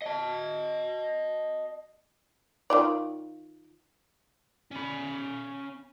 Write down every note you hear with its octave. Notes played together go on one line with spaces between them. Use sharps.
D#5 A5
D#3 F4 D5
C#4 B5